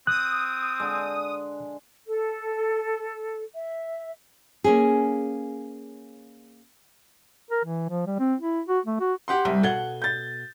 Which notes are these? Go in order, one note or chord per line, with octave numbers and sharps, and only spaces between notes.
C4 D#6 F#6
D3 G#3
A4
E5
A#3 C#4 G#4
A#4
E3
F3
G3
C4
E4
F#4
A3
F#4
G4 F#5 C6
C2 G3
B2 A4 F5 F#5 G#6 G7
G6 A6